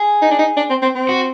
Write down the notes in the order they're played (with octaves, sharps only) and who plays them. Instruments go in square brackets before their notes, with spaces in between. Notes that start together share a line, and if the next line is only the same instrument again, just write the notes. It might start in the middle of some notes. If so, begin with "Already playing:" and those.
Already playing: [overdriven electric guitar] G#4
[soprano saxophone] D#4
D4
D#4
D4
C4
C4
C4
[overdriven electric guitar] F#4